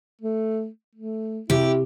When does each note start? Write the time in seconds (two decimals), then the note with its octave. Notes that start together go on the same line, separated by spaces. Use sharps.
0.22 A3
0.95 A3
1.50 C3 E4 G4